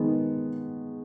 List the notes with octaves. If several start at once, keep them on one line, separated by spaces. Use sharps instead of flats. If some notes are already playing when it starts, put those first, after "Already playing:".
Already playing: D#3 G#3 B3